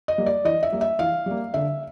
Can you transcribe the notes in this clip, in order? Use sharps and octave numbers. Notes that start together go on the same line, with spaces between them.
D#5
G3 A#3
D5
E3 D#5
E5
G3 A#3
E5
E3 F5
G3 A#3
D3 E5